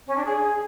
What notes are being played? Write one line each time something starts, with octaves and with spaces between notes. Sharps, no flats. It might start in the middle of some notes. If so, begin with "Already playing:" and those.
C#4
D4
G#4